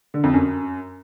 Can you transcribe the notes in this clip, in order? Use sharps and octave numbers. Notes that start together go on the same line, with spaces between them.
D3
F2
F#2